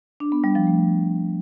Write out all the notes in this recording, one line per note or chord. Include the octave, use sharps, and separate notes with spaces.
D4
B3
G3
F3
A3